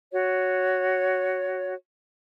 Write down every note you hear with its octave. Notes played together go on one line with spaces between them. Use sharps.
F#4 C#5